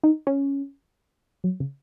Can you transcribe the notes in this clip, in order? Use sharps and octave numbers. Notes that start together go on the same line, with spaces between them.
D#4
C#4
F#3
C#3